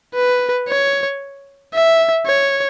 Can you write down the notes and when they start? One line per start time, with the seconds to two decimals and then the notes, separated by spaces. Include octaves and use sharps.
0.15 B4
0.68 C#5
1.74 E5
2.26 C#5